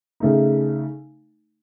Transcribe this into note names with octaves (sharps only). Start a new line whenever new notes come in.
C#3 A3 D#4